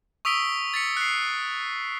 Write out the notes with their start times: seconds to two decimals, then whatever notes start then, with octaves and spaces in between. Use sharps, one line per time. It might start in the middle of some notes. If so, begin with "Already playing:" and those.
0.25 C#6 D#6 E6 B6 D7 G7
0.74 A6 B6 C#7
0.97 F#6 C7